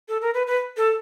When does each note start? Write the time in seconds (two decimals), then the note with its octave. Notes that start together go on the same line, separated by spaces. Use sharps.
0.09 A4
0.22 A#4
0.34 B4
0.47 B4
0.77 A4